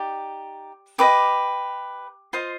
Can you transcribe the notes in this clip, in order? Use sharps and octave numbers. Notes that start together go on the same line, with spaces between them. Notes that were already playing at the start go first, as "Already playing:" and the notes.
Already playing: D#4 G4 D5 D6
G4 B4 D#5 D6
F4 C5 D#5 C6